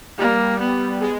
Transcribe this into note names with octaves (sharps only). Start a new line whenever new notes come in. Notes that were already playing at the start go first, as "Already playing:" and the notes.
G3 A#3
B3
G#3